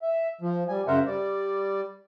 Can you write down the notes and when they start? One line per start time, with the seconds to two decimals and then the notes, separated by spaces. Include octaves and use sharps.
0.02 E5
0.41 F3
0.69 G3 G#5
0.87 F#2 C#3 A#4 C5 E5 F#5
1.06 G3 D5